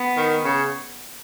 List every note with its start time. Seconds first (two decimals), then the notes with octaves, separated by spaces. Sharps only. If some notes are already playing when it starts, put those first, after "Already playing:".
Already playing: B3
0.17 D#3
0.44 C#3